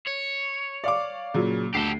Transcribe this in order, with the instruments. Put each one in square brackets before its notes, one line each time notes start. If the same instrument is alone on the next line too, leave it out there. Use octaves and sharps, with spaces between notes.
[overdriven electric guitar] C#5
[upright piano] D5 F5 D6
A#2 C#3 F#3
[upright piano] D2 C7 [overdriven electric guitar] G4 A4